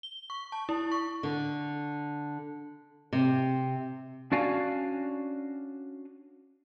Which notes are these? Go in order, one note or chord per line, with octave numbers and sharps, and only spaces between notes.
G7
C#6
A5
E4
C#6
D3
C3
C#4 D4 F#4 D5 F5 G#5